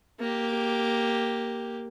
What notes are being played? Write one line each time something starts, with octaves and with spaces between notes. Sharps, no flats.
A#3 G4